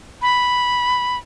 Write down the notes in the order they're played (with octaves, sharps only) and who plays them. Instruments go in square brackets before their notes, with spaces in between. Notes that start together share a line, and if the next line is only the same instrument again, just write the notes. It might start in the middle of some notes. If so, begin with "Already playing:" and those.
[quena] B5